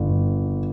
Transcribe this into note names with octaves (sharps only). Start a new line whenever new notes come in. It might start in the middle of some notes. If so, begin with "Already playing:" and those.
Already playing: G1